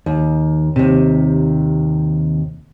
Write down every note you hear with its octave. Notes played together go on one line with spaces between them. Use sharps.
D#2
D#2 C3